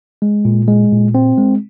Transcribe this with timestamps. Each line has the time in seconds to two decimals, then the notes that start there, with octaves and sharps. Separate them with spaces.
0.22 G#3
0.45 A#2
0.68 G#3
0.92 A#2
1.15 C4
1.38 G#3